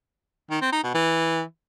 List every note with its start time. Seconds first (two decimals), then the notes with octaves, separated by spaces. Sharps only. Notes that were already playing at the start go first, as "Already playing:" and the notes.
0.50 D#3
0.61 C4
0.72 D#4
0.83 B2
0.94 E3